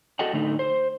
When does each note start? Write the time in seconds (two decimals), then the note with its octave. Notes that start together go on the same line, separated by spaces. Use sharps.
0.19 F#4 A4 D#5 F#5 G5
0.33 A2 D3 A3 D#4
0.59 C5